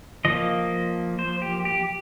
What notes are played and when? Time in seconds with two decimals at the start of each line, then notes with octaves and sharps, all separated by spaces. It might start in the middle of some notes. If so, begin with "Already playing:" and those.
0.25 F3 A#3 D#5
1.19 C5
1.42 G4
1.65 G4